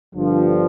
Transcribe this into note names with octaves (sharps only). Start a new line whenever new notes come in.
G1 G2 D3 F3